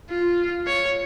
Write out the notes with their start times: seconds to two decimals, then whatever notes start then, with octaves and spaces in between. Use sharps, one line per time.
0.10 F4
0.67 C#5